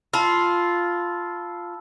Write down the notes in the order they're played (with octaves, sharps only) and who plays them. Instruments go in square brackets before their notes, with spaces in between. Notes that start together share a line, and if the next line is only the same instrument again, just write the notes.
[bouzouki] F4 [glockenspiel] A5 B5 E6